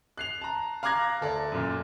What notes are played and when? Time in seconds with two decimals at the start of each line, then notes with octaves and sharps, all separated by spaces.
0.17 F#6 C7 F7
0.41 A5 A#5
0.83 F5 A#5 D6 F#6 G#6 A#6
1.21 D2 A4 D5
1.52 F#2 A#2